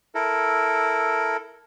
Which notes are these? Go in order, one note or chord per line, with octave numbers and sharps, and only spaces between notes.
E4 A4 A#4